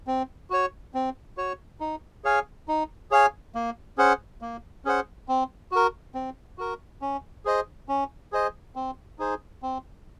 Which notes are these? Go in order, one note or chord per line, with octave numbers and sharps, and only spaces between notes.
C4
F#4 C#5
C4
F#4 C#5
D#4
G#4 C#5 F5 G#5
D#4
G#4 C#5 F5 G#5
A#3
C#4 G#4 C5 F#5
A#3
C#4 G#4 C5 F#5
C4
F#4 A#4
C4
F#4 A#4
C#4
G#4 C5 D#5
C#4
G#4 C5 D#5
C4
D#4 G#4 C5
C4